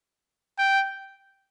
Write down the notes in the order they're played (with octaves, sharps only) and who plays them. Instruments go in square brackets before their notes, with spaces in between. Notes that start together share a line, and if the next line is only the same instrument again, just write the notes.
[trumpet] G5